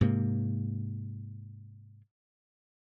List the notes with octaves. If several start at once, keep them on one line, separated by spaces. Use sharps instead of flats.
G#2 C3 A#3